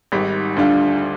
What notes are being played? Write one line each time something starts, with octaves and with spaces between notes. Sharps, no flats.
G#1 G#2 D#3 G3
D2 D3 G3 D4 F4